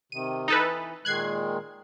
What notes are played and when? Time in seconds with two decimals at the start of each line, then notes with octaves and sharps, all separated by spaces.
0.12 C3 D#3 D#7
0.48 E3 D#4 A4 B4
1.05 A#2 D#3 G#3 F#6 G#6 C7